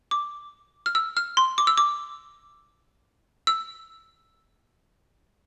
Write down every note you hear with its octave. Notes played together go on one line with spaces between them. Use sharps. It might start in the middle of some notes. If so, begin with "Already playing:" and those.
D6
F6
E6
F6
C6
D6
E6
D6
E6